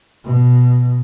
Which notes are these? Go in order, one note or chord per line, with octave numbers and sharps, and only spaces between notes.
B2